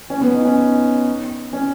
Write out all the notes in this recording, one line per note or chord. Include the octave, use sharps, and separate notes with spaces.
C#4
B3
D#4
C#4
C#4